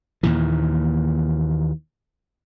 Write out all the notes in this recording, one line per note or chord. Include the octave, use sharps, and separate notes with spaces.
D#2 A#2 E3